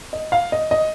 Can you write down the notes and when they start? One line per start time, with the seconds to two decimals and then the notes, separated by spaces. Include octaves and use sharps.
0.13 D#5
0.32 F5
0.52 D#5
0.71 D#5